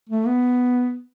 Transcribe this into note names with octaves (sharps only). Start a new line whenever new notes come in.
A3
B3